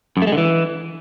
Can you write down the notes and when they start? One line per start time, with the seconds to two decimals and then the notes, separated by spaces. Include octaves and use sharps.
0.17 F#2
0.22 A3
0.27 G#3
0.32 D3
0.38 E3